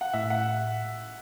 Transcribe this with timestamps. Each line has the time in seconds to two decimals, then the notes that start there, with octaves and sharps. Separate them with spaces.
0.01 F#5
0.13 A2 E5
0.30 F#5